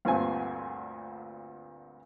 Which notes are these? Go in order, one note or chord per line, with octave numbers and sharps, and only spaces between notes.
D2 G2 A#2 C4 G#5